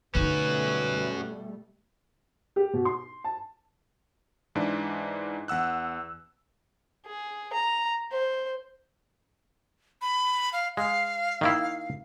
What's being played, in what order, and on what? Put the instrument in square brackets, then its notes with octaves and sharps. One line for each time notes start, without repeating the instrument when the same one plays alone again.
[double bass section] B2 G3 A3 [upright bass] D3 D#4 [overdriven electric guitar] C#4 F#4 [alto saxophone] B4
[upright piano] G4
B2
C6
A5
[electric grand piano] G#2 E3 D4
E2 F#5 E6 F#6
[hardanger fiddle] G#4
A#5
C5
[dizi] B5
F5
[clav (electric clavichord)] G#3 [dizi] F5
[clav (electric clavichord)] D#3 A#3 E4